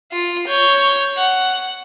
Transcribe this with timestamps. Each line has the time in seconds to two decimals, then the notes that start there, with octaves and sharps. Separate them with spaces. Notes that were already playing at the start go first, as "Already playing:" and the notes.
0.12 F4
0.48 C#5 G6
1.18 F#5